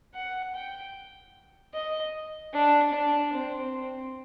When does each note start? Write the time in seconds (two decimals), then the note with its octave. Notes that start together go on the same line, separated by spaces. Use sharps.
0.15 F#5
0.54 G5
1.74 D#5
2.53 D4
2.93 D4
3.33 C4
3.73 C4